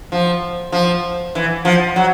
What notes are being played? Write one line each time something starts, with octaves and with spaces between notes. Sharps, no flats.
F3
F3
E3
F3
F#3